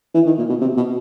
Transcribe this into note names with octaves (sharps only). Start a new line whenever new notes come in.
E3
D#3
A#2
B2
C3
B2